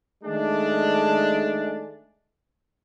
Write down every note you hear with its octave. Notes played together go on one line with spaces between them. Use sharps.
D#3 G#3 A3 D4